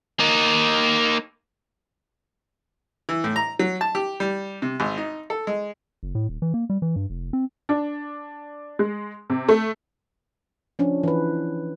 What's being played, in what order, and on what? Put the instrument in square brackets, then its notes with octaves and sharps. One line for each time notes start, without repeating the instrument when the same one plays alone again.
[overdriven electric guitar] A#3 D#4
[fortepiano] E3
A2
A#5
F#3
A5
G4
G3
C3
G#1
D#4
A4
G#3
[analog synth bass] F#1
A2
D#1
E3
A#3
G3
E3
G2
F1
C4
[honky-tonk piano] D4
G#3
C3
A3
[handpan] F3 C#4 D4
E3 B4